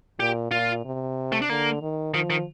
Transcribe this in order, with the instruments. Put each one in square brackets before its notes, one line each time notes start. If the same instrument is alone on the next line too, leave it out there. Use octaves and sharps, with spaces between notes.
[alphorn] A#2 [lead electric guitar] G4
[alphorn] A#2 [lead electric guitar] F4
[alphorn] C3
[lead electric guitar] A3
D4
[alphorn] D3 [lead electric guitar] A#3
[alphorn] D#3
[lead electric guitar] D#3 [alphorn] F3
[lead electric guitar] D#3